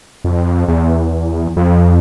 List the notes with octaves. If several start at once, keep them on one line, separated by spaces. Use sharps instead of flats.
F2
E2
F2